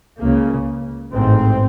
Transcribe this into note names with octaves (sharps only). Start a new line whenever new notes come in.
C#2 C#3 A#3
A1 G#2 C4